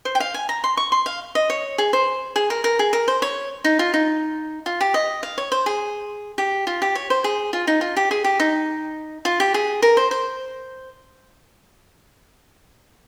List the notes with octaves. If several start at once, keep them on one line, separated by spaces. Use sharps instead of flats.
C5
G5
F5
G#5
A#5
C6
C#6
C6
F5
D#5
C#5
G#4
C5
G#4
A#4
A#4
G#4
A#4
C5
C#5
D#4
F4
D#4
F4
G4
D#5
F5
C#5
C5
G#4
G4
F4
G4
C#5
C5
G#4
F4
D#4
F4
G4
G#4
G4
D#4
F4
G4
G#4
A#4
C5
C5